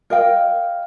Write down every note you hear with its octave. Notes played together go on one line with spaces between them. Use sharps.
A#4 D#5 F5 G5